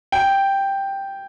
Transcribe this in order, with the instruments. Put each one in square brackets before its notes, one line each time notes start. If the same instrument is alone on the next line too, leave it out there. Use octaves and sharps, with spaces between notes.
[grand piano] G5